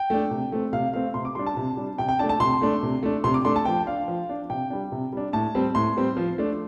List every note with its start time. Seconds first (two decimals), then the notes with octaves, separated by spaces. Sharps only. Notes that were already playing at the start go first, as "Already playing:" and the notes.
Already playing: G5
0.10 A3 D4
0.31 C3
0.52 A3 C4
0.73 C3 F5
0.94 A3 C4 F5
1.14 C3 C6
1.25 D6
1.35 G3 D4 C6
1.46 A5
1.57 C3
1.77 G3 D4
1.98 C3 G5
2.09 G5
2.19 A3 D4 A5
2.29 A5
2.40 C3 C6
2.62 A3 D4
2.83 C3
3.03 A3 D4
3.24 C3 C6
3.34 D6
3.45 A3 D4 C6
3.56 A5
3.65 F3 G5
3.87 D4 F5
4.08 F3
4.29 D4
4.50 C3 G5
4.70 G3 D4
4.92 C3
5.13 G3 D4
5.33 A2 A5
5.55 G3 C4
5.75 A2 C6
5.97 G3 C4
6.17 F3
6.38 A3 D4